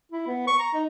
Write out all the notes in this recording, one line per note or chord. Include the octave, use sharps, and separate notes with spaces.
E4
B3
C#6
A#5
D#4